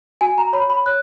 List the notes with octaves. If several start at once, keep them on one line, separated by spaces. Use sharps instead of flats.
F#4 G#5
A#5
C#5 B5
B5
C#5 F#6